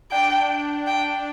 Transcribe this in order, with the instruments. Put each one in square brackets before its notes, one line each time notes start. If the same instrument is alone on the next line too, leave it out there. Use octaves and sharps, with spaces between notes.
[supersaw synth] D4 [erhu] G5
[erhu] G5